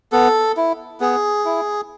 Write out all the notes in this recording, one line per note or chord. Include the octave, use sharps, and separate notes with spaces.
B3 A4
E4
B3 G#4
E4